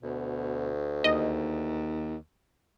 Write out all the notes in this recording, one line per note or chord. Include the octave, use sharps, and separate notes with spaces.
D2 B2
D#2 D#5